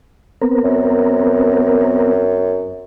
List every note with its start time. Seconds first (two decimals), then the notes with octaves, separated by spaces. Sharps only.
0.42 B3 C4 A#4
0.64 F#2